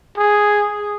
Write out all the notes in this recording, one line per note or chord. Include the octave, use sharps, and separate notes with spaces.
G#4